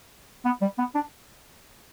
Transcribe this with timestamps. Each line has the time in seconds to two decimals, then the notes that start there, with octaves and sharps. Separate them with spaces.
0.45 B3
0.61 G3
0.78 B3
0.95 D4